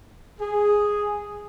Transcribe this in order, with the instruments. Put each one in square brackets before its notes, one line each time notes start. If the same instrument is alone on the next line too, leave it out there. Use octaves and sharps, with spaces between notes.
[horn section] G#4